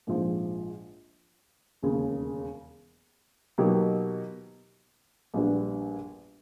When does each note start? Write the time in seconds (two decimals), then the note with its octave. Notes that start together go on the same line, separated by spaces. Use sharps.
0.07 A#1 G#2 F3
1.83 E1 D#2 C#3
3.58 B2 F#3 A#3 D#4 G4
5.34 A#1 A#2 G3 B3 D4